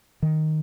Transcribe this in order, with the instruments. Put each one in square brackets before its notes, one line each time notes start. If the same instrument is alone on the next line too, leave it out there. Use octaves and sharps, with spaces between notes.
[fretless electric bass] D#3